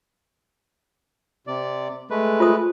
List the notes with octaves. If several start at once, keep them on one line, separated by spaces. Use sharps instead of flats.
C3 D5
G#3 A3 B4
F4 C5 D#6